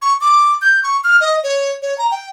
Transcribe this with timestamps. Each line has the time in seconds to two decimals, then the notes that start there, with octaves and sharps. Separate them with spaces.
0.02 C#6
0.21 D6
0.62 G6
0.83 C#6
1.04 F6
1.21 D#5
1.43 C#5
1.82 C#5
1.98 A#5
2.11 G5